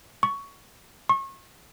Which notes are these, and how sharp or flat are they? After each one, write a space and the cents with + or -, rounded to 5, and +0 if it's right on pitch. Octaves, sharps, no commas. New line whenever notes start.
C#6 +10
C#6 -35